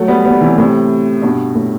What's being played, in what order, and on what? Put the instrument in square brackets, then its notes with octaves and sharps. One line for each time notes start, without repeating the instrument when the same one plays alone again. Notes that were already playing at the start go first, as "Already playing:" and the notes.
Already playing: [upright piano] F#3 A3
G3 B3
G3 B3
C3 E3
A2 C3
G2 B2
A2